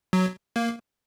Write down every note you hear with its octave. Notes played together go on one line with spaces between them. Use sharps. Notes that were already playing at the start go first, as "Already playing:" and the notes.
F#3
A#3